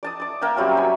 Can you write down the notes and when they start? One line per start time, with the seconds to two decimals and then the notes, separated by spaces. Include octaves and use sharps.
0.03 D5 A5 D#6
0.20 D6 D#6
0.41 A#3 A#4 E5 G5
0.56 F#3 G3 C4 C#4
0.77 G#5 B5